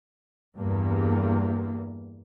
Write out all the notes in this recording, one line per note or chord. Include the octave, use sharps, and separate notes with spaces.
E2 G2 G3 A#3